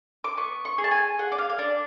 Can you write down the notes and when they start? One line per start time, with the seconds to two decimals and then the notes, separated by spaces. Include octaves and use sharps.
0.24 D6
0.37 B3 C#6
0.65 C#6
0.78 G#4
0.84 A5
0.91 G#5
1.19 G#4 F#5
1.32 D5
1.38 F5
1.49 F5
1.58 D4 D5